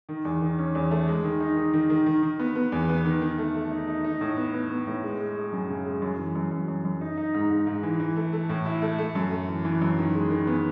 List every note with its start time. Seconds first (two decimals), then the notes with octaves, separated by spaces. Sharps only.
0.09 D#3
0.25 E2
0.41 D#3
0.58 C#4
0.75 E2
0.91 A3
1.08 G#3
1.24 D#3
1.40 D#4
1.57 D#3
1.73 D#3
1.90 D#3
2.06 D#3
2.23 D#3
2.39 B3
2.55 B3
2.72 E2
2.89 B3
3.05 D#3
3.21 D#3
3.38 A3
3.55 A3
3.71 D#4
3.88 D#4
4.04 D#4
4.21 A2
4.37 B3
4.53 B3
4.70 B3
4.87 A2
5.03 G#3
5.20 G#3
5.36 G#3
5.52 F#2
5.69 C#3
5.85 G#3
6.02 F#2
6.18 E3
6.35 F#2
6.51 F#2
6.68 F#2
6.85 F#2
7.01 D#4
7.17 D#4
7.34 G#2
7.50 G#2
7.67 G#2
7.83 E3
8.00 E3
8.16 A3
8.33 A3
8.49 A2
8.65 E4
8.82 A3
8.99 A3
9.15 F#2
9.31 A3
9.48 E3
9.65 E3
9.81 F#2
9.98 D#3
10.14 G#3
10.30 D#3
10.47 B3